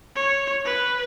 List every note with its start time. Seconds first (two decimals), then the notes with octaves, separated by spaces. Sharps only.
0.16 C#5
0.66 B4